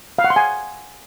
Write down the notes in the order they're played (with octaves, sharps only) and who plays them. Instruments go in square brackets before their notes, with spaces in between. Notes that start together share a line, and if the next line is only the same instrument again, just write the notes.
[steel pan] F5
F#5
C6
G#5